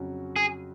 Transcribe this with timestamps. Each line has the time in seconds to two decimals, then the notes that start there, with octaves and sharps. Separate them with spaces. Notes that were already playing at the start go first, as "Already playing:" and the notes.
Already playing: F2 C#3 F#3 C#4 F#4
0.36 G#4